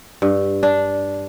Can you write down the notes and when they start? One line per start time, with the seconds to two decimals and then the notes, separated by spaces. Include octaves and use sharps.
0.22 G2
0.63 D4